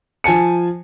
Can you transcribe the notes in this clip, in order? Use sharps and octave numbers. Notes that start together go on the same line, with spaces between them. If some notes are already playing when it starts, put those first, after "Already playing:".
F3 G#5 A5 C#7